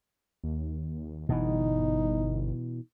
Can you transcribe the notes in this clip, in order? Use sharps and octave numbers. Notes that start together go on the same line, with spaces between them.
D#2
G1 B2 E3 D#4